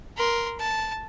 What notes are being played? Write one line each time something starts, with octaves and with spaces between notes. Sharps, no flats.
A#4 C6
A5